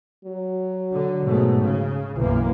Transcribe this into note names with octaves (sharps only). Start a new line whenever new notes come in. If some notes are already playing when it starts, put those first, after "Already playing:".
F#3
D3
G#2 B2 A3
C#3
B1 F#2 E3 A#3